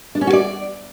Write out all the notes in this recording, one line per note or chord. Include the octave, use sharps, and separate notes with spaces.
D4
C#4
F#4
D5